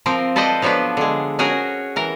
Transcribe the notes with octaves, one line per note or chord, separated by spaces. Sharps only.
F3 C4 A#4
A4 B4 C5 D5 D#5 A5
F3 F#3 B3 D4 B4
D3 G#3
C#4 F#4 G#4 A#4
E3 A#4